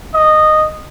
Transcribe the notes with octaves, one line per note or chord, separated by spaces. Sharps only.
D#5